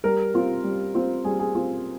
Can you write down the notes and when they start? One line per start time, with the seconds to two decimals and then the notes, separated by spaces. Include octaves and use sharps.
0.04 G3 A#4
0.34 C4 F4
0.64 G3
0.95 C4 F4
1.24 G3 G#4
1.39 G#4
1.55 C4 F4